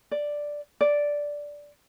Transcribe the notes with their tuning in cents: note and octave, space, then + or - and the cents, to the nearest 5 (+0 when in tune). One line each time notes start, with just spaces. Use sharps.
D5 +0
D5 -5